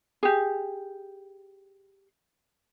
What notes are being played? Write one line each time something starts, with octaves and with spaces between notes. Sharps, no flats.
G4 G#4